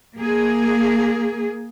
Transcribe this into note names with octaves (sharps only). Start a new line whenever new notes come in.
A#3 G#4